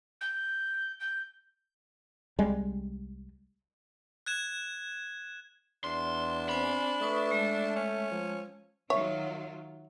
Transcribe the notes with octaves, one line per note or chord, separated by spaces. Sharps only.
G6
G6
C2 G3 G#3
F#6 G#6 E7
E2 D4 C6
C4 C5 G#5 B5
A3 B4 C#6 D#6
G#3 A5
C#4
F3
D#3 F#3 F4 C#5 E5